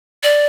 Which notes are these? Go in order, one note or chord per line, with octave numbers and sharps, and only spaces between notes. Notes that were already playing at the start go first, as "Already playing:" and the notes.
D5